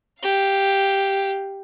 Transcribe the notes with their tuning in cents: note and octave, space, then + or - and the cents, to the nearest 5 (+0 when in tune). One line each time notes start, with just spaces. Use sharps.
G4 +0 F5 +0